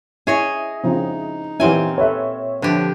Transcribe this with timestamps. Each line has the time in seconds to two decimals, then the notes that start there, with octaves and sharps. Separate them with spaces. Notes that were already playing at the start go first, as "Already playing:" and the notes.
0.27 C#4 E4 G#4 C#5 D#5
0.84 C#3 F3 C4 D#4
1.60 A#2 E3 C4 C#4 E4 F#4 G4 G#5
1.98 A4 B4 C#5 E5
2.62 D3 F3 G4 B4